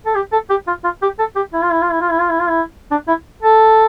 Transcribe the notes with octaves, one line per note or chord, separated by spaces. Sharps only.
A4
G4
A4
G4
F4
F4
G4
A4
G4
E4
F4
E4
F4
E4
F4
E4
F4
E4
F4
E4
D4
E4
A4